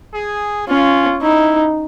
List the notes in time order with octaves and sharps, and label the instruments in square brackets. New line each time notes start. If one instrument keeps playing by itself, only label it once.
[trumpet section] G#4
[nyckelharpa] C#4 [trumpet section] F4
[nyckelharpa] D#4 [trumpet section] E4